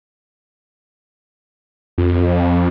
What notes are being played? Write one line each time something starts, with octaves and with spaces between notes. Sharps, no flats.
F2